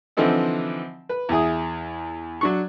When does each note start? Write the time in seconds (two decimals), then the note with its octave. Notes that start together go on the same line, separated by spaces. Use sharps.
0.17 D3 E3 F3 C4 D#4 E4
1.09 B4
1.29 E2 E4 G#4 D#6
2.41 F#3 D4 C#6